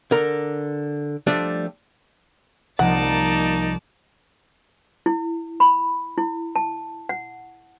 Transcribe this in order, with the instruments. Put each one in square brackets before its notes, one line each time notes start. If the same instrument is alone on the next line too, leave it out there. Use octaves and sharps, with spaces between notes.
[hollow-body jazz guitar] D3 A#4
F3 G3 A3 D4
[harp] C2 F3 A#5 [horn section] A#3 D#4 [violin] D5 A5 [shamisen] F#5
[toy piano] E4
B5
E4
A5
F#5